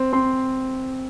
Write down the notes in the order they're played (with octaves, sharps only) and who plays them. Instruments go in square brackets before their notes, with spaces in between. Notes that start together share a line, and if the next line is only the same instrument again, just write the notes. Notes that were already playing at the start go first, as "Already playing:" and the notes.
Already playing: [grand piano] C4
C4 C6